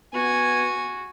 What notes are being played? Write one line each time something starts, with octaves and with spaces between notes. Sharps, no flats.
B3 F#4 G#5 G#6